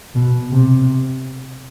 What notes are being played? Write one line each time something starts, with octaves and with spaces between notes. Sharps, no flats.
B2
C3